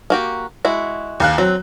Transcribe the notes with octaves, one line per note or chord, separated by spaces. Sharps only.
A#3 F#4 G4
G#3 E4 F#4
D#2 F5 F#6
F#3 C4